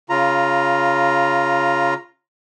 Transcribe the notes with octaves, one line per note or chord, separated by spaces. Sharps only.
C#3 F4 A#5